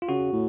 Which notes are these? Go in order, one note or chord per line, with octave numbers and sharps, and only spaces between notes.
F4
C#3 F#4
A2